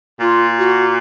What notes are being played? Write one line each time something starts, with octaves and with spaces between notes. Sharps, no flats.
A#2 F4
F#4